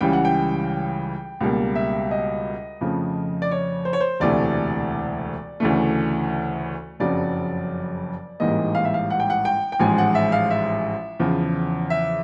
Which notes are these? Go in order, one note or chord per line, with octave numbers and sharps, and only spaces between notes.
C#2 C#3 E3 G3 G5
F#5
G5
C#2 B2 G3 A#3
E5
D#5
F2 C#3 F3 A3
D5
C#5
C5
C#5
C5
E1 D2 C3 E3 A3 D5
D2 C#3 E3 A3
F#1 F2 C#3 F#3 D5
A1 G#2 E3 G3 A#3 D#5
F5
E5
F5
F#5
G5
F#5
G5
G5
A1 G#2 F3 G#3 G#5
F#5
E5
F5
E5
E2 C#3 F3
E5